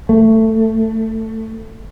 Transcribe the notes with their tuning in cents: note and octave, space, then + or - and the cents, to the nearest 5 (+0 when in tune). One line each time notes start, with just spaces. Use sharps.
A3 +15